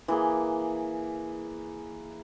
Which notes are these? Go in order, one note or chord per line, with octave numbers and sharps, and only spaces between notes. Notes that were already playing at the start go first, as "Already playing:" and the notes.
E3 A#3 G#4